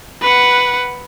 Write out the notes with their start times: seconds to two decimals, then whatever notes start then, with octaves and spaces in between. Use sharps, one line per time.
0.22 B4 F#5